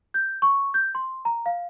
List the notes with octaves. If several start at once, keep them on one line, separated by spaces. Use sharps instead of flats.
G6
C#6
G6
C6
A#5
F5